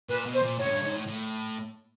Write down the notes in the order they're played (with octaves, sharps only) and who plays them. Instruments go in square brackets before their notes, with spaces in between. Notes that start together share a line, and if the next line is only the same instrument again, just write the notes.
[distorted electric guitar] A#2 [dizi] B4
[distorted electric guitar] B2
[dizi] C5
[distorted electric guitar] A#2
[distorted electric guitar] A2 [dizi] C#5
[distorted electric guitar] F#2
G2
G#2
A2
A2